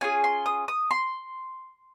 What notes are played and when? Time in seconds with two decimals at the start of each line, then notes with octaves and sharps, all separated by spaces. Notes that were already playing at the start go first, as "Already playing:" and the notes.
0.01 C#4 F4 G#4 G#5
0.24 C6
0.46 D#6
0.68 D#6
0.91 C6